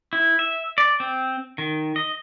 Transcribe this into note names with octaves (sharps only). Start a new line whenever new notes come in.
E4
E5
D5
C4
D#3
D#5